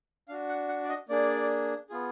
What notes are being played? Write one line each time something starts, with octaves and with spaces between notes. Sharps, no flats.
D4 F#4 F5
F#5
F#5
D5
D#5
A#3 D4 G#4 D5
B3 F4 G#4